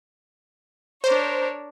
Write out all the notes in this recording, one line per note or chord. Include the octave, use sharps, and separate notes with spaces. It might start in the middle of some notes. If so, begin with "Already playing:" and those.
D4 A#4 C5 C#5